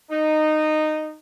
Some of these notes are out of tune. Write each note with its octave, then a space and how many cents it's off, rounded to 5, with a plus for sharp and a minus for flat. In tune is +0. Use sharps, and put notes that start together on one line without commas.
D#4 -15